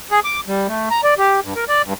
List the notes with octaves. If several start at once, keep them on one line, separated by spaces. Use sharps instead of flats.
G#4
D6
G3
A3
A#5
D5
G4
G2
A#4
D5
G2